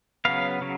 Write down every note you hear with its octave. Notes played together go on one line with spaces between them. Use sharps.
C#3 F#3 B3 F5
C#3 F#3